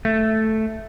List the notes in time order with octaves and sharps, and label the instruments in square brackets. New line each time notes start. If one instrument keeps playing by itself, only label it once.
[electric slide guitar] A3